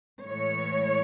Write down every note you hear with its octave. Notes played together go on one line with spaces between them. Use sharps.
A2 E3 G#3 C#5